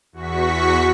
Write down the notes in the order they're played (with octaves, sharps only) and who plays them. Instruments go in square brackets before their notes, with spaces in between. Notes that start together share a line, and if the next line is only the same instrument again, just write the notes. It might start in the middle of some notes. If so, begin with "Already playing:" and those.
[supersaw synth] E2 F#4 C#6 B6